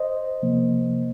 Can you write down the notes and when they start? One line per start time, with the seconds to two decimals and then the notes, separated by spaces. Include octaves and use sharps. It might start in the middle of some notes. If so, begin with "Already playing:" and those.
Already playing: C5 D#5
0.42 C3 F3 A#3